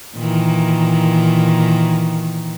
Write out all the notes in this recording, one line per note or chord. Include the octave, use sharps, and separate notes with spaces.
A#2 D#3 E3